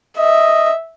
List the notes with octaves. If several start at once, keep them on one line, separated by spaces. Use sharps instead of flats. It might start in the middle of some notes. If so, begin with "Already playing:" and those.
D#5 E5